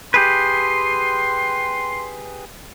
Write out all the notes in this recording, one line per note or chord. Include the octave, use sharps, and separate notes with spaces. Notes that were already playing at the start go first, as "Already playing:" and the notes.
G4 G#4 B4 C6